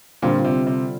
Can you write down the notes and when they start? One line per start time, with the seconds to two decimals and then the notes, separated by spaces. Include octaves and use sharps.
0.22 A#2 D3 G3 C4 F4
0.44 C3
0.67 C3